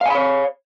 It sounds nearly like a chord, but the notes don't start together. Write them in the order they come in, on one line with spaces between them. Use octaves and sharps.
F5 G#5 B5 C#5